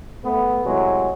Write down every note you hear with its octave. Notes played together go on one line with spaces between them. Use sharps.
A3 B3
A2 C3 F#3 G#3